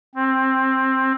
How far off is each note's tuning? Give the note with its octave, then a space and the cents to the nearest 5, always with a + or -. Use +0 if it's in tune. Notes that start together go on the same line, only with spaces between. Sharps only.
C4 +15